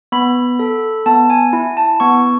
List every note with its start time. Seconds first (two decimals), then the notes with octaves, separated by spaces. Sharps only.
0.12 B3 B5
0.59 A4
1.06 B3 A5
1.30 G#5
1.53 E4
1.77 A5
2.00 B3 C#6